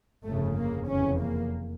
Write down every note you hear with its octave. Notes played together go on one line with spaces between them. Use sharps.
G1 F2 C#3 A3
A#3
F1 E2 C#3 C#4
A#3